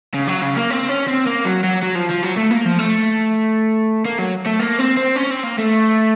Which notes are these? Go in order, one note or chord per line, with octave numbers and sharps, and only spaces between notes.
C#3
F#3
C#3
A#3
C4
C#4
C4
A#3
F#3
F#3
F#3
F3
F3
F#3
A3
A#3
F3
A3
A#3
F#3
A3
A#3
C4
C4
C#4
C4
A#3
A3